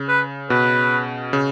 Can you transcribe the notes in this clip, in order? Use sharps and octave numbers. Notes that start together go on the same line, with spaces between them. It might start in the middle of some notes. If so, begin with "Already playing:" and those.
Already playing: C#3
B4
B2 B4
C#3